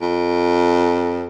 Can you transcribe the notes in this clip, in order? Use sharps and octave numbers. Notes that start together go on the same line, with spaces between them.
F2